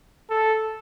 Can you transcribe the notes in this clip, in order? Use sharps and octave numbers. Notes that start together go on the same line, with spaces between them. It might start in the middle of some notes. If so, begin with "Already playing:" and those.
A4